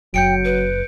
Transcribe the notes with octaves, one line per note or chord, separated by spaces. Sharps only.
F#1 F#2 F#3 G5 G6 C#7 D7
B4